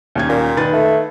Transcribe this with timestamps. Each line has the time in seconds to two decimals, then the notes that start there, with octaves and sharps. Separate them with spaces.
0.15 D#2 C#4 G#6
0.29 A#2
0.57 D#3 B4 A6
0.73 A3